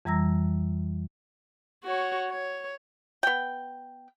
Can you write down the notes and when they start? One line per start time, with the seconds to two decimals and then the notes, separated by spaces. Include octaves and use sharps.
0.05 F2 E3 G3 A#5 E6 A#6
1.84 F#4 C#5
2.30 C#5
3.23 B3 G5